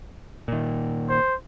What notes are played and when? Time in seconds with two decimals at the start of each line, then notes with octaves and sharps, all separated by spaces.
0.48 A#2 D#3
1.09 C5